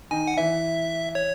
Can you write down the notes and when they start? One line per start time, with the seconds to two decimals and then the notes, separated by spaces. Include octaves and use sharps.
0.11 D#3 D#4 G#5
0.27 F#5
0.37 E3 E4 E5
1.15 C#5